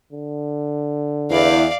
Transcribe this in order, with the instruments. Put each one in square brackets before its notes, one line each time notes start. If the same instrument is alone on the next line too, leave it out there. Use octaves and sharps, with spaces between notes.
[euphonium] D3
[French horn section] E2 E4 [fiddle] D5 F5